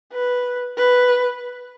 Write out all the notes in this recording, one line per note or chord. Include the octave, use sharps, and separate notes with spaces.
B4
B4